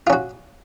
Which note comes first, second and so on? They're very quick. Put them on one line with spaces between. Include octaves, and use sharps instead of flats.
F4 C#4 F#4